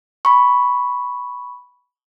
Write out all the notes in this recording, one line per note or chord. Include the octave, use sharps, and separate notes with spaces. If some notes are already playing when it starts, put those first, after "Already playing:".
B5 C#6